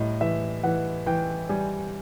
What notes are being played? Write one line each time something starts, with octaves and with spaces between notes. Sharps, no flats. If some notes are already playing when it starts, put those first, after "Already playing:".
Already playing: A2 G3 D#5
E3 E5
E3 F#5
E3 G5
G3 G#5